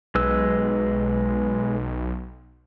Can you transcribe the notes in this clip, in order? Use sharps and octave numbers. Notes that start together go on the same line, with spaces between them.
B1 G#3 B4 E6